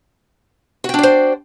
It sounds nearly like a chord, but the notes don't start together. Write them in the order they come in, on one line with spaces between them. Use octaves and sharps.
F#4 G5 D4 D5 C5